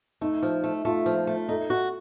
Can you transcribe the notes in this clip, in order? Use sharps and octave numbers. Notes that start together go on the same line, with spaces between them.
A3 D#4
F3
A3
A3 F4
F3
A3
D#4 A4
F#4